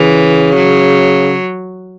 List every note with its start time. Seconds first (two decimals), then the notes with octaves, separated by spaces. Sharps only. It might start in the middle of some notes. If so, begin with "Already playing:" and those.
Already playing: C#3 E3
0.56 F#3